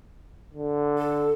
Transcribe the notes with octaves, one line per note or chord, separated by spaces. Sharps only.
D3
A4